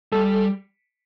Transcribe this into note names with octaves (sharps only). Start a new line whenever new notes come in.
G3 A4